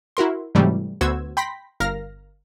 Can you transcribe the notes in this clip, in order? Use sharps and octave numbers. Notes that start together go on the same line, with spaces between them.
E4 F#4 A#4 C6
G#2 C3 E3 F#3 G3 A3
D2 B3 F#4 C5 E6 G#6
G5 B5 C6 A#6 B6
G1 A#4 F5 F6 A#6